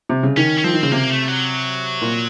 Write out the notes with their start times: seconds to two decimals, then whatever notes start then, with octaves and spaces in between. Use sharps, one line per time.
0.09 C3
0.23 C#3
0.37 D#3 C#4
0.58 C#4
0.64 F3 C4
0.73 D#3
0.83 C#3
0.92 C3 A#3
1.10 A3
1.28 F#3
2.02 A#2